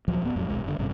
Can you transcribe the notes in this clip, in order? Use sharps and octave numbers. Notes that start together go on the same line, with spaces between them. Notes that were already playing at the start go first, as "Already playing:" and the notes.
D2 A#2 F3 F#3
D1 A2 B3
E1 F2 A2 F#3
D#1 B1 G#3
F#1 D3
A1 G2 C3 C#4